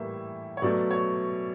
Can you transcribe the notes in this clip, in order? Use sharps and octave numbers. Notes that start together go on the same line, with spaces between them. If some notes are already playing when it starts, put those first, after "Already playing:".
Already playing: A2 E3 G3 A#3 E5
C#5
B2 F#3 A3 D5
C#5